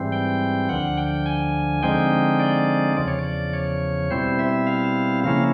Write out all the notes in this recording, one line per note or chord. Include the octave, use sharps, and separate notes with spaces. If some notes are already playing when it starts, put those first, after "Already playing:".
Already playing: G#2 E3 G3 C4
G5
D2 D3 F3 F#5
G5
G#5
D3 F3 G#3 C4 D#4 G5
D5
E2 C#3 F3 D5
C#5
D5
C#5
B2 G3 C4 E4 C5
E5
F5
C#3 F3 A#3 C#4 E4 F5